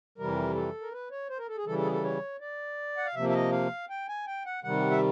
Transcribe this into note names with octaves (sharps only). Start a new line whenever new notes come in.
F2 C3 E3 G3 A#4
A4
A#4
B4
C#5
C5
A#4
A4
G#4
C#3 E3 G3 A4
A4
G#4
A4
C#5
D5
F#5
F5
C3 F3 A#3 E5
E5
D#5
F5
G5
G#5
G5
F#5
C3 D#3 G3 F#5
E5